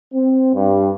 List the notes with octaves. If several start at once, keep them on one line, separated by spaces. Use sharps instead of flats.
C4
G2